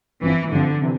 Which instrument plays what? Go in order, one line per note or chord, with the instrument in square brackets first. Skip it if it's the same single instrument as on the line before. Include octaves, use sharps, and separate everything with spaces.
[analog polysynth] G1 G2 F3 C4 [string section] E3
[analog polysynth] G1 G2 F3 C4 [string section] D3
[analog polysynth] C3 E3